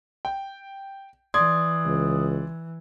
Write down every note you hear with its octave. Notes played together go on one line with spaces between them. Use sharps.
G5
E3 D5 C6 D#6 G#6
C#2